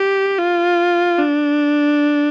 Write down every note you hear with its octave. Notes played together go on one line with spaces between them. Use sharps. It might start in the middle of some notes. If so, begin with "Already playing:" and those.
Already playing: G4
F4
D4